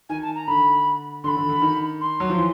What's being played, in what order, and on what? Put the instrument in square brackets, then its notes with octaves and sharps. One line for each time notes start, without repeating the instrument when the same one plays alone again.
[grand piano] D#3 [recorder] G#5
[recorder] A5
A#5
[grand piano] D3 [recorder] B5
[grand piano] D3 [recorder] C6
[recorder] B5
[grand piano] D3
D3
D#3
[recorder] C6
[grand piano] F#3
F3
E3